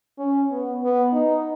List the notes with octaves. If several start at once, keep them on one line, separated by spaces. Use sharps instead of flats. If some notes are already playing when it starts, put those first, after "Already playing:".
C#4
B3
B3
D#4